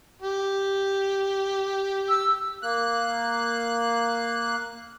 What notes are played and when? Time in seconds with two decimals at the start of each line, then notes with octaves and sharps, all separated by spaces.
0.22 G4
2.08 E6
2.63 A#3 F#6